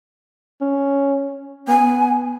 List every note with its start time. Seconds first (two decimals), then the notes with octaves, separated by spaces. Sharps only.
0.61 C#4
1.68 B3 G#5